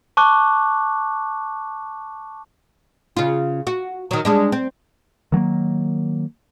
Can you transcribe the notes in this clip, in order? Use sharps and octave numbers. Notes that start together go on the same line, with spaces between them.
A5 C#6 D6 F#6
C#3 F4
F#4
D#3 F#3
G3 G#3 D4
C4
D#3 F#3 A3 A#3